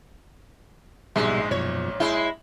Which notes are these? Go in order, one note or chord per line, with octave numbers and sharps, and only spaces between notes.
A#1 G#2 B2 G3 G#3 E5
F#2 B2 F3 C#5
G#3 E4 C6 G6